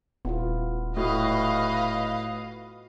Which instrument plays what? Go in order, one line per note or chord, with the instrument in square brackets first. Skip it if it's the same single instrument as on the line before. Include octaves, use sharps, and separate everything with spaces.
[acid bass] D#1 [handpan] B3 E4 F4
[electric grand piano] A2 [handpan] F#4 [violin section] B4 D#5 F5